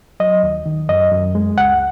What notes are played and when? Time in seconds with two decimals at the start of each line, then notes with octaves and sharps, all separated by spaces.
0.20 F#3 D#5
0.43 D#2
0.66 D#3
0.89 F#2 D#5
1.12 F#2
1.35 G#3
1.57 C#2 F#5